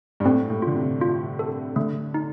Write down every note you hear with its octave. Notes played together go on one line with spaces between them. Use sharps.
G2
A2 C4
A2
D3 F4
C3
F4
A4
D3 A3
D#4